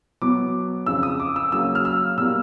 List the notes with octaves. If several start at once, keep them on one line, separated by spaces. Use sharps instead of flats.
B2 F#3 B3 D6
F2 C#3 F3 E6
D#6
D6
E6
C#3 F#3 A#3 E6
F6
E6
B2 G3 A#3 E6